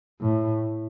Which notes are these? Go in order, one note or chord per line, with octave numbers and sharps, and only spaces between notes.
A2